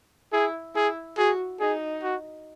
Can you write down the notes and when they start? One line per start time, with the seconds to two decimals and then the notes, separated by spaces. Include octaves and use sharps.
0.33 E4 G#4
0.75 E4 G#4
1.18 F#4 G#4
1.60 D#4 G#4
2.03 F#4